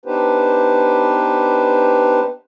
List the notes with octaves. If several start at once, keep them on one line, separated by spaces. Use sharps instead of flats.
B3 D4 D#4 G4 B4 C5